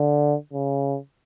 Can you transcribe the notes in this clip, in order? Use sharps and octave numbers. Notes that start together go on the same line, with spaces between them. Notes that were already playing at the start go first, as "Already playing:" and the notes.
Already playing: D3
C#3